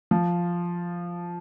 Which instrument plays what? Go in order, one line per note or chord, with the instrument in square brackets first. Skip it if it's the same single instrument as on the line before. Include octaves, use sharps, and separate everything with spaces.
[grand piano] F3